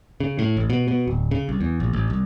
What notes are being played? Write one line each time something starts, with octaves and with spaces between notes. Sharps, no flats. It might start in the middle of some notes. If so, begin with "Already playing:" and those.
C#3
A2
A1
B2
B2
D1
C#3
C2
E2
A#1
A1
C2